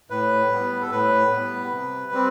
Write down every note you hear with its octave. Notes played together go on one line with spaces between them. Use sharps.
A2 B4
G3 B3
A4
A2 B4
G3 B3
C3
G3 C4